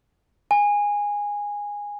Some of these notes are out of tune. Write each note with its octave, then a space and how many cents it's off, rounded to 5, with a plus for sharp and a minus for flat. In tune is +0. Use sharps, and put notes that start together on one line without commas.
G#5 -15